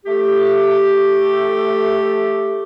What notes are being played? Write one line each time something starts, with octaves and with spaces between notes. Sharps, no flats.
A3 G4